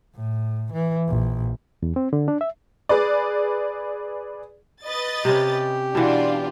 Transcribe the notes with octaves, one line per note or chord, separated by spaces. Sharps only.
A2
E3
A#1
E2
C4
D3
D4
E5
G#4 B4 D5
B4 D#5 A6
C3 C#4 G4
B2 E3 D4 F4 F#5